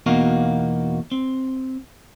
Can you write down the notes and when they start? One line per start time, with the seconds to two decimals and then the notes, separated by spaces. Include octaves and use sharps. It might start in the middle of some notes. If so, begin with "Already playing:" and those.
0.06 E2 B2 A#3 D#4 F#4 F5
1.11 C4